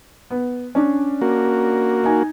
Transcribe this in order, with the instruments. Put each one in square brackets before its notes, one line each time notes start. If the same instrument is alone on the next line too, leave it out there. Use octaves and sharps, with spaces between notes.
[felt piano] B3
C#4 D4
[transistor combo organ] A#3 F#4
[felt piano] D#4 G#5